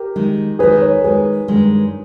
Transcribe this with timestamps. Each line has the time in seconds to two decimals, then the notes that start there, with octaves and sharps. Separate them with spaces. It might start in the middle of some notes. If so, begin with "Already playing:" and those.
Already playing: G4 A#4
0.16 D#3 G#3 D#4
0.59 D#3 G#3 D#4 G#4 B4
0.81 A#4 C#5
1.04 D#3 G#3 D#4 G#4 B4
1.48 G2 D#3 G#3